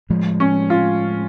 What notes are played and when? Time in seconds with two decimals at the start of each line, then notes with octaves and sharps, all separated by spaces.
0.10 A2 F3 G#3
0.40 C#4
0.70 F4